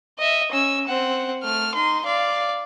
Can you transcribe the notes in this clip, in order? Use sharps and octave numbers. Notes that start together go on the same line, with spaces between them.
D#5 E5
C#4 E6
C4 F#5
A3 F6
D#4 C6
D5 F5